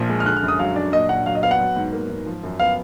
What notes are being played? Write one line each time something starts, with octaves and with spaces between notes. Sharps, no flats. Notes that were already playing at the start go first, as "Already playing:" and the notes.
Already playing: A#1 A#2 F3
G#3
F6
D3 F#6
F6
F#2
D#6
F#3 F5
D4 D5
A#2 D#5
A#1 F#5
F#3 F5
D#5
B3 F5
F#5
F#3
G#2
A#3
G#2
F3
F#2
B3 F5